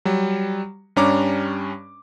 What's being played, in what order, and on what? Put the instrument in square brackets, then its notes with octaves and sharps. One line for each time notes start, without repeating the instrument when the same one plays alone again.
[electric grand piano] F#3 G3
G2 G3 C#4 D4 A#5 D6